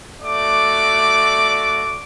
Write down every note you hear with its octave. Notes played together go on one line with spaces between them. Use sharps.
A3 F#4 D5 D6